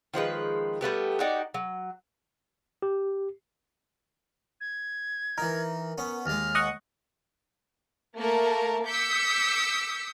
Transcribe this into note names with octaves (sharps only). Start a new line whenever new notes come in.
D#3 F3 G#3 B4
G3 A3 B3 G4
D#4 F#4 G4 D5
F#3
G4
G#6
E3 D#4 A#4
B3 C#4
D#2 G#3 F6
D#5 F#5 C#6
A3 A#3 A#4 A5
D6 E6 G6 B6 C#7